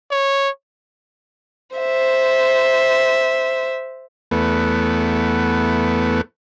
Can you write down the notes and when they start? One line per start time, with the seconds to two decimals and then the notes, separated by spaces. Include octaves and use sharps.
0.11 C#5
1.75 C5 E5
4.31 E2 A3 B3